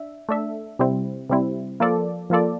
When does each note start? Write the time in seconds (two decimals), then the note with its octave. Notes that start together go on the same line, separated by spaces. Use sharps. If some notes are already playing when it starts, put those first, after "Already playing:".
Already playing: D4 E5
0.29 A3 D4 A4 E5
0.79 C3 G3 C4 E4
1.29 C3 G3 C4 E4
1.80 F3 A#3 F4 A4 D5
2.30 F3 A#3 F4 A4 D5